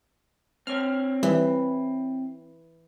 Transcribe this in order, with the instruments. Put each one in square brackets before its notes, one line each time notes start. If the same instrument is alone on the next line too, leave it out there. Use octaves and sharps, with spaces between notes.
[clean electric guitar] C4 C#5 [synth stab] F6
[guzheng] E3 [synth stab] G3